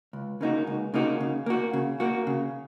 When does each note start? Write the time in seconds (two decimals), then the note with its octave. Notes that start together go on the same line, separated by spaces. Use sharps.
0.13 C#2
0.41 C#3 A#3 D#4 F#4
0.67 C#2
0.94 C#3 A#3 D#4 F#4
1.20 C#3
1.46 A#3 F#4
1.73 C#3
2.00 A#3 F#4
2.27 C#3